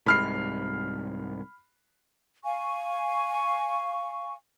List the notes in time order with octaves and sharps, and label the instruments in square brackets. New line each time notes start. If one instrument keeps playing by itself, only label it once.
[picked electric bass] C2 G#2 C3 [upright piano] B5 F6 C7
[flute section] F5 G#5 C#6